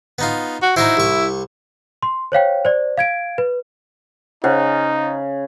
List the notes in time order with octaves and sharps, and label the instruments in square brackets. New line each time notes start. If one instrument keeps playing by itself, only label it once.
[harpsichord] B3 D#4 F4
[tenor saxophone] F#4
[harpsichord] D#4 F#4 C5 [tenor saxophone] E4
[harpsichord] C2 C#6
[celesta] C6
C5 C#5 F5 G5
C5 D5
F5 G#6 D7
B4
[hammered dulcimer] C#3 [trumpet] D#4 [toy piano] C5 F#5